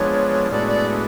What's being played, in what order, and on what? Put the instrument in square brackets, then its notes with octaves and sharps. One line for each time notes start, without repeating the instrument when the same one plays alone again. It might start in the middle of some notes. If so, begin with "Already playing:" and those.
Already playing: [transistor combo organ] F3 G#3 B3 D4 [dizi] C#5
[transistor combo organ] A2 G#3 B3 D4 F#4 [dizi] D5
[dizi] D5